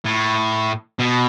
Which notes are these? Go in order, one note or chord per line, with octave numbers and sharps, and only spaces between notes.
A2
B2